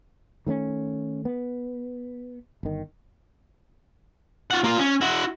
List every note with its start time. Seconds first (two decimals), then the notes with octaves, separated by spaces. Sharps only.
0.46 D#3 A3 B3 C#4
1.25 B3
2.63 G1 D#3
4.51 F4 F#5
4.64 A#3 F4
4.79 C#4
5.01 E4 F#4